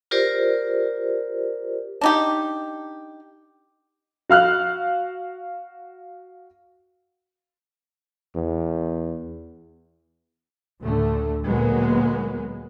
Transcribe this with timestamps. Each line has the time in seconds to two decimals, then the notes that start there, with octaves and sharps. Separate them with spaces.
0.11 F4 G4 A#4 C5 D5
2.01 D4 D#4 G4
4.29 F#4 F5 F6 F#6
8.36 E2
10.82 D2 A2 D3 A3
11.46 D2 A#2 F#3 G#3 A#3 B3